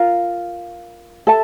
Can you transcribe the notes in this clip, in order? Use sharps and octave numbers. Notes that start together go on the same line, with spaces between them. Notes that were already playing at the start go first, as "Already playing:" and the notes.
Already playing: F4 A#4 F5
A4 E5 A5